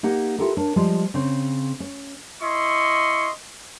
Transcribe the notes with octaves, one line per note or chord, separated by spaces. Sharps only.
A#3 D#4 G4 F#5
E4 F4 G4 A4 A#4
D4 A#4 C#5
F3 G3 G#3 F4
C#3 C4 C#4
C#4
E4 D#5 C6 C#6